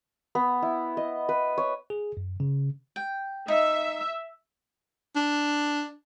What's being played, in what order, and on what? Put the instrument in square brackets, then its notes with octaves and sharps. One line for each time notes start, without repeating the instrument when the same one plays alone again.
[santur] B3
E4
D#5
B4
C#5
[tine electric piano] G#4
F#2
C#3
[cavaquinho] G5
[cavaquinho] D#4 [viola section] E5
[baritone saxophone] D4